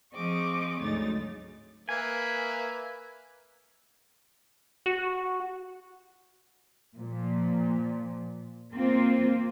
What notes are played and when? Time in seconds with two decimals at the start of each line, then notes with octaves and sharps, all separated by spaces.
0.14 F3 C4 G#4 D#5 C#6 D6
0.80 D2 G#2 C#3 F#3 D#4 A6
1.89 A#3 B4 E5 G#5
4.86 F#4
6.98 A#2 F3
8.74 A#3 C4 F4